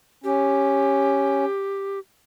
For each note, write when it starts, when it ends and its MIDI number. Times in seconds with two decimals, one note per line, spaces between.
0.24 1.45 61
0.24 1.99 67